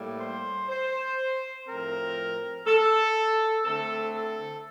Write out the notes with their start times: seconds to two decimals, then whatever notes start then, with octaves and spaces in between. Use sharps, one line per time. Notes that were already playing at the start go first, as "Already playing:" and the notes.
Already playing: A2 G3 A#3
0.19 C5
0.69 C5
1.67 A2 F3 C4 A#4
2.66 A4
3.64 D3 A3 C4 A4
4.14 A4